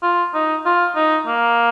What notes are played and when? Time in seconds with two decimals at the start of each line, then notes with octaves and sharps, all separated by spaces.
0.03 F4
0.34 D#4
0.65 F4
0.96 D#4
1.27 A#3